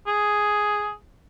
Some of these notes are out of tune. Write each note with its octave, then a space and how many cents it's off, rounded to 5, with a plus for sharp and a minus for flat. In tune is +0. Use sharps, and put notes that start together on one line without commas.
G#4 +5